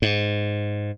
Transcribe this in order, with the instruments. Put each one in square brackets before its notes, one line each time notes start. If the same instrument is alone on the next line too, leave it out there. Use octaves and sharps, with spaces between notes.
[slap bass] G#2